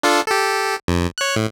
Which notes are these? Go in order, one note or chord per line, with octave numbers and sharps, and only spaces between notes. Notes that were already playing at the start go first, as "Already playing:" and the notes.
D4 F4 A4
G4 A4
F2
C#5 F#6
A2